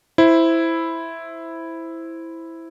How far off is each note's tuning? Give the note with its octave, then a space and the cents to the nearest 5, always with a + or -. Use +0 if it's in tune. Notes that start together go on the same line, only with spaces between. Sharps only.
E4 +0 C5 +0